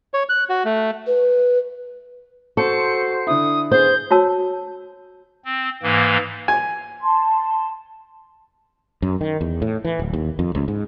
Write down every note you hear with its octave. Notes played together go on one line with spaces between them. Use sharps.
C#5
F#6
F#4
A3
B4
F#4 A4 C5 C#6 C#7
D3 E4 D#6
B3 G#4 C5 G6
F#4 C#5 A5 E6
C4
G#2 E3 A#3
G#5
A5 C6
F#2
D#3
E2
A2
E3
D1
D#2
F2
C#2
G#2